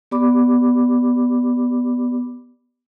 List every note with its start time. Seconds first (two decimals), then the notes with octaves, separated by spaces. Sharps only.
0.11 B3 G4 D5 B5 D6